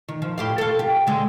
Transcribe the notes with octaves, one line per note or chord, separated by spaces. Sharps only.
D#3
F3
A2 G4 F5
F4 A4
G4
D3 G#3